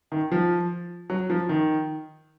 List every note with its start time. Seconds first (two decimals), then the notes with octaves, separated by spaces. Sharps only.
0.12 D#3
0.32 F3
1.10 F#3
1.30 F3
1.49 D#3